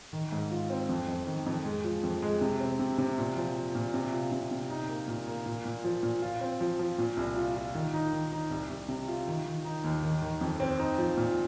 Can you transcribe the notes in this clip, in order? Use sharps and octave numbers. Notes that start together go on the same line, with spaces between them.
D#3
G#2
F4
C4
F2
F2
D#3
F2
G#3
F3
F2
G#3
C3
C4
C3
C3
A#2
F3
F3
A#2
C3
F4
C3
C3
D#4
A#3
A#2
A#3
A#2
A#2
F3
A#2
F4
C4
F3
F3
A#2
C2
F4
F4
D#3
D#4
D#3
D#4
C2
C2
C3
F4
D#3
D#3
D#4
D#2
D#3
D#3
F2
C4
D#4
F3
A#2